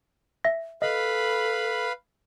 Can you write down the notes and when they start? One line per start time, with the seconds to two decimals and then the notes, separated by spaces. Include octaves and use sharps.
0.44 E5 A#6
0.82 A4 B4 D#5 F5 B5